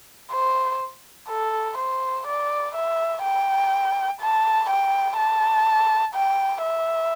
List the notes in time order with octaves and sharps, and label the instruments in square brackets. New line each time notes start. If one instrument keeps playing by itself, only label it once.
[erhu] C5
A4
C5
D5
E5
G5
A5
G5
A5
G5
E5